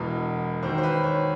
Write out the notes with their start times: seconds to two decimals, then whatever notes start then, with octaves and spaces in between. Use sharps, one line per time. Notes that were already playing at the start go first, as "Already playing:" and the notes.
Already playing: E1 E2 B2
0.63 D#2 D#3 F#3 C5
0.78 C5
0.83 B4
1.03 C#5